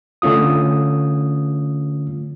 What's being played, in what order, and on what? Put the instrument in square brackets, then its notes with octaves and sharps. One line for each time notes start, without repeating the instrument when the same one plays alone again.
[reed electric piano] D3 A3 C#4 F4 D#6